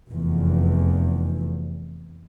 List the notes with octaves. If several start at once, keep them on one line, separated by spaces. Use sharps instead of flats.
F1 E2